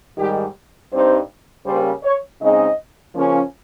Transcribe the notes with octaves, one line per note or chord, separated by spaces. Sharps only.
G#2 D#3 G3 G4
G2 G3 C4 D#4 C5
C#3 G3 A#3 C#4 C5
C#5
C#3 G#3 C4 D#4 D#5
C#3 F3 A#3 C#4